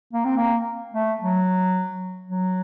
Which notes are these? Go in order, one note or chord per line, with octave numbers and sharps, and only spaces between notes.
A#3
C4
A#3
A3
F#3
F#3